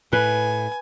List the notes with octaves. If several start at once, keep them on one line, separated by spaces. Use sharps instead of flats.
A2 B4 G#5